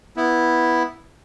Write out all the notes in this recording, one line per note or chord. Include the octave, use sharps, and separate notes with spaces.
B3 E4